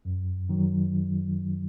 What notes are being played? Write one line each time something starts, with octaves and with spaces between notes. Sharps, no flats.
F#2
D#3 F#3